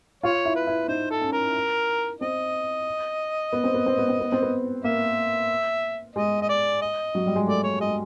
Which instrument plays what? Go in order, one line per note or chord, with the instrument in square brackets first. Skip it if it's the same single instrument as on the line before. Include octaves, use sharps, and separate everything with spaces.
[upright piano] F4 [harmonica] C#5
[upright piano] E4
[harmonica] B4
[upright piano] E4
[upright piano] D#4 [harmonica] C5
[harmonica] A4
[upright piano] C#4
[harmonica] A#4
[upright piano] C4 [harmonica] D#5
[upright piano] B3
C4
B3
C4
B3
C4
B3
C4
B3
[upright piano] A#3 [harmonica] E5
[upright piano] G#3 [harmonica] D#5
[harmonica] D#5
D5
D#5
[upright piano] F#3
G3
G#3
[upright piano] A3 [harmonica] D5
[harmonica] C#5
[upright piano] G#3 [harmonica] D#5